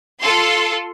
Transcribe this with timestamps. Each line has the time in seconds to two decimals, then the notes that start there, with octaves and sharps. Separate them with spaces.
0.20 F4 A4 C6